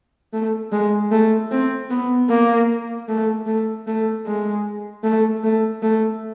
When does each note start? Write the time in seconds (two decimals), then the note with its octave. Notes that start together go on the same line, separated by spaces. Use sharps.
0.33 A3
0.72 G#3
1.11 A3
1.52 C4
1.90 B3
2.30 A#3
3.08 A3
3.47 A3
3.87 A3
4.26 G#3
5.03 A3
5.44 A3
5.82 A3